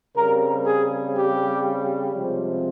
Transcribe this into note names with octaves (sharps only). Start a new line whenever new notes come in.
C#3 G3 C4 A#4
G#4
G4
C3 F3 G#3 C4